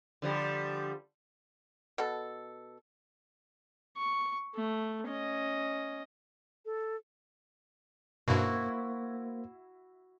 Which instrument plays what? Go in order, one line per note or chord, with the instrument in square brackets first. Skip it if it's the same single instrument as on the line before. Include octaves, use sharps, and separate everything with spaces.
[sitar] D3 F3 G3
[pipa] B2 A4
[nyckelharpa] C#6
A3
C#4 D#5
[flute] A4
[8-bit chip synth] G2 B2 [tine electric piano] A#3 C5 [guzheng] E4 F#4